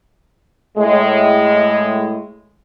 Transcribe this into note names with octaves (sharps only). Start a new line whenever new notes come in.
A2 G#3